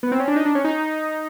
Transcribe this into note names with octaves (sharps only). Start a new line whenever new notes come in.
B3
C4
C#4
D4
D#4
D4
C#4
D#4